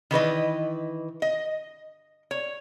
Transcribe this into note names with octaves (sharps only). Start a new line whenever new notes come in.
D#3 E3 B4 D#5
D#5
C#5